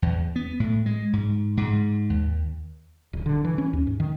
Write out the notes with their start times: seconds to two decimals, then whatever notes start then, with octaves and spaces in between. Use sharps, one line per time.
0.02 E2
0.36 B3
0.60 A2
0.86 G#3
1.13 G#2
1.57 G#2
2.10 D#2
3.13 D1
3.26 D3
3.45 E3
3.58 C#4
3.73 D#2
3.87 G#2
4.00 D#3